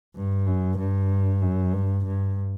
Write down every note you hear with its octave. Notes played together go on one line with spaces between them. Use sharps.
G2
F#2
G2
F#2
G2
G2